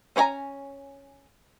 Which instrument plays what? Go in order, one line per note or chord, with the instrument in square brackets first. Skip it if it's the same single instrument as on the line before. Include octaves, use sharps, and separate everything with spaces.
[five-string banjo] C#4 C5 C#5 G#5 A#5